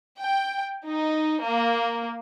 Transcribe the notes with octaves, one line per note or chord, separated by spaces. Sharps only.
G5
D#4
A#3